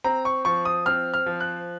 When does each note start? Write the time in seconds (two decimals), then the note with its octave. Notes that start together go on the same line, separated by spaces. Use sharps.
0.04 C4 A#5
0.25 C#6
0.45 F3 C#6
0.65 D#6
0.86 C4 F6
1.14 F6
1.26 F3
1.40 F#6